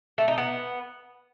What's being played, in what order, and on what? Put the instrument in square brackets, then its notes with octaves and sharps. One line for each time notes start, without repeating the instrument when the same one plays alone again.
[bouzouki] A3
D#4
B3